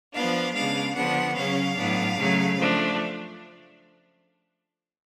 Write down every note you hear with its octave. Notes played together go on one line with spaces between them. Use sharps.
F3 B3 D4 F5
C#3 G#3 B3 D4 F5
D3 F3 B3 D4 F#5
C#3 F#3 C#4 F5
A2 F#3 B3 D4
C#3 F#3 A3
F3 A3 D4